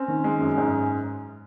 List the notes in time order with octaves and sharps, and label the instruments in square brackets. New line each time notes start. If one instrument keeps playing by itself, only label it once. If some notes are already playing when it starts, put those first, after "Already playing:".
Already playing: [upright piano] C4 [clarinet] C#4
[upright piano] D#3
G#3
F#2
G#2